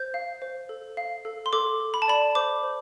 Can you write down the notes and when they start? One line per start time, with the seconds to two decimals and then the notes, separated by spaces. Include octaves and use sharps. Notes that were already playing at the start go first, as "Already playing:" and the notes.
Already playing: C5 G6
0.14 F5
0.42 C5
0.69 A4
0.97 F5
1.25 A4
1.46 C6
1.53 A4 D6
1.80 A4
1.94 B5
2.02 A5
2.08 D5 B5
2.35 C5 D6
2.63 C5